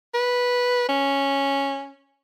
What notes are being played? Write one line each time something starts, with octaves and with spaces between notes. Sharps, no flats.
B4
C#4